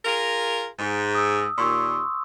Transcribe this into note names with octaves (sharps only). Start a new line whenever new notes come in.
F4 G#4 A#4
G#2
D#6 E6
D#2 A#2 C6 C#6 E6